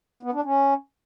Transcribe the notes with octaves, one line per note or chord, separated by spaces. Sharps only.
B3
D4
C#4